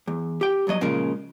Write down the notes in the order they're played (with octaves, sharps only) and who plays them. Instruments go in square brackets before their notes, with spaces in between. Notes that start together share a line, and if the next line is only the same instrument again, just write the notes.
[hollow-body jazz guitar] E2
G4 G5
B1 G2 F#3 D#5
A#2 C#3 F3 G#3 A#4